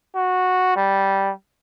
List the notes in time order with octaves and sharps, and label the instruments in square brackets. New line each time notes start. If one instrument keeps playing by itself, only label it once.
[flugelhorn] F#4
G3